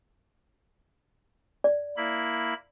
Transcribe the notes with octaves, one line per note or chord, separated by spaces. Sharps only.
D5
A#3 E4 B5